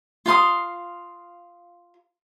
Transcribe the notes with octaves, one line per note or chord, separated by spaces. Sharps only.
F4 F5 C6 D#6